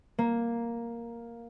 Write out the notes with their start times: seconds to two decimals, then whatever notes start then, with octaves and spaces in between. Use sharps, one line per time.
0.18 A#3